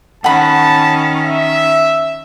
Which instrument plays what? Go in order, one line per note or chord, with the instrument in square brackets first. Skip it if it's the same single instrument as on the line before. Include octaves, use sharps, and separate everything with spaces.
[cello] D#3 C#4 [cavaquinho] F#5 B5 [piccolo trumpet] A5
[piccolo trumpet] E5